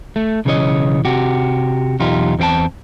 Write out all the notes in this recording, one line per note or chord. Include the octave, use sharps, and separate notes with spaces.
A3
B1 C#3 E3 D4 C#5 D#5
C3 F#4 G4
B1 E2 D#4 F4 G4
E2 C4 F4 G5 A5